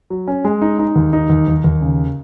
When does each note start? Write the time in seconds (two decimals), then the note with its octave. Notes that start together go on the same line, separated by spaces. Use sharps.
0.10 F#3
0.27 C#4
0.45 G#3
0.62 D#4
0.79 D#4
0.96 D#2
1.13 D#4
1.30 D#2
1.48 D#2
1.64 D#2
1.81 C#3